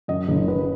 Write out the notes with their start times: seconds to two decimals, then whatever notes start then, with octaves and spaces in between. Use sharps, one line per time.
0.08 F#2 D#5
0.28 F#1
0.48 F#1 B4